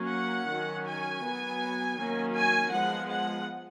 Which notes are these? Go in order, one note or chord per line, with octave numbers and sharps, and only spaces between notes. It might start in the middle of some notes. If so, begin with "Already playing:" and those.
Already playing: F#3 A#3 C#4
F#5
D#3 F#3 C#4
G#5
F#3 B3
D#3 F#3 A#3 C#4
G#5
F3 G#3 B3 F#5
F#5